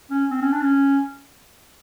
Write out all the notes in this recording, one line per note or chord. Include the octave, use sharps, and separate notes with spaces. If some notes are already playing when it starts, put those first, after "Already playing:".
C#4
C4
C#4
D4
C#4